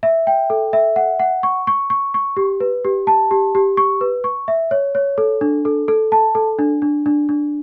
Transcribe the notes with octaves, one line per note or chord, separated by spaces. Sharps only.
E5
G5
A4
E5
F#5
F#5
C#6
C#6
C#6
C#6
G4
B4
G4
A5
G4
G4
C#6
B4
C#6
E5
C#5
C#5
A4
D4
A4
A4
A5
A4
D4
D4
D4
D4